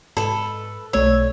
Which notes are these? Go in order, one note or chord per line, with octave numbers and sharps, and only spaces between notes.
G#2 A4 B4
B1 A3 C#5 E6